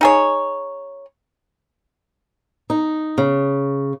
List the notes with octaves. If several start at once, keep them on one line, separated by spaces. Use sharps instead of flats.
D#4 G#4 C#5
D#4
C#3